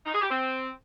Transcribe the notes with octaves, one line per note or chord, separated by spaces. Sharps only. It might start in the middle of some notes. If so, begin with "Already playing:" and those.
D#4
G#4
G4
C4